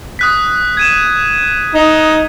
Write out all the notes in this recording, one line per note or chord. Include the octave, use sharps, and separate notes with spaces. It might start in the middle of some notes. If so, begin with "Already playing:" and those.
D#6 F#6 B6
G#6 D#7 E7
D#4